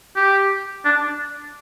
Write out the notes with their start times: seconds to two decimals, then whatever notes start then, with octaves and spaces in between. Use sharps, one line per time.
0.16 G4
0.85 D4